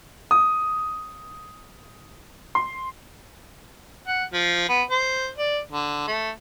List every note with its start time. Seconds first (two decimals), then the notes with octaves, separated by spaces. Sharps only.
0.31 D#6
2.55 C6
4.07 F#5
4.33 F3
4.69 B3
4.91 C5
5.37 D5
5.71 D3
6.07 A3